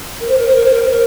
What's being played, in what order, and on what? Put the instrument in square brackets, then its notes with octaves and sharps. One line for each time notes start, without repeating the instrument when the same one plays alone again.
[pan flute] A#4
C5
A#4
C5
A#4
C5
A#4
C5
A#4